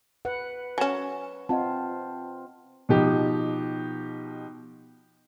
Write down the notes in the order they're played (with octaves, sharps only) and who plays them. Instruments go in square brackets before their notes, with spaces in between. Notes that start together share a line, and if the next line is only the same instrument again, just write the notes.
[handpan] B4 F#5
[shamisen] F#3 C#4 [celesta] G#5 E7
[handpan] C4 F4 [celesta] D#5 F#5 A5
[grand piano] B2 F3 D#4 G4